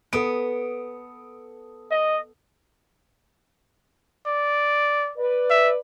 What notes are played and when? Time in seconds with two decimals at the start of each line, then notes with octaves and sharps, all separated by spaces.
0.13 B3 A4 D#6 D7
1.91 D#5
4.26 D5
5.18 B4 D5
5.50 E5